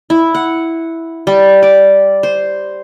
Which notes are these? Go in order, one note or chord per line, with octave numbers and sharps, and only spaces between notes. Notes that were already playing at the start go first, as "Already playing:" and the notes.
E4
F#5
G3
D5
C5